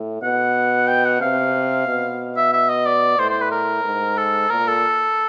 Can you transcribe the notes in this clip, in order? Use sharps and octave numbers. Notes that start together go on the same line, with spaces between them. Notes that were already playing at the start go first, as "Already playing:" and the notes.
Already playing: A2
B2 F#5
G5
F#5
C3 F5
B2
E5
E5
D#5
D5
A2 C5
C5
B4
A#4
G#2
A4
A#2 A#4
A4